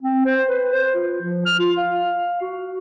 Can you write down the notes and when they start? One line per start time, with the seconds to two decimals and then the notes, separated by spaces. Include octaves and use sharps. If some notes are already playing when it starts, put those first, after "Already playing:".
0.02 C4
0.25 C5
0.49 B4
0.73 C5
0.95 F4
1.21 F3
1.46 F6
1.59 F4
1.78 F5
2.41 F#4